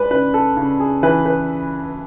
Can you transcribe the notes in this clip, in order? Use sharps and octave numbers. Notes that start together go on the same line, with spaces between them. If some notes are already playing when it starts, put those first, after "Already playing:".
Already playing: G#3 B4 D5
C#3 B4
A4
C#3
G#4
E3 B4
B4